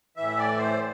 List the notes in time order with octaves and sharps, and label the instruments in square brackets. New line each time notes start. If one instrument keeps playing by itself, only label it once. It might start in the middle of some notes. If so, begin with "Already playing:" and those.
[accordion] A2 E3 E5
D5
C5